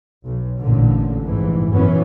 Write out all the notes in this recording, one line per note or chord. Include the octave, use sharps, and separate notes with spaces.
B1
A1 A#2 D3
F1 G#2 E3
A#1 F#2 E3 B3 C#4